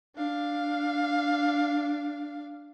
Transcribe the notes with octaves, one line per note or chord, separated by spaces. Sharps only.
D4 F5